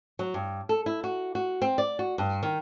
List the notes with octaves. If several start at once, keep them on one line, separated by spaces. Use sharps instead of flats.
F#3
G2
A4
E4
F#4
F#4
C4
D5
F#4
G2
D#3